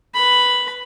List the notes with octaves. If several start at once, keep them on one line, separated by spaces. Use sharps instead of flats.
B4 B5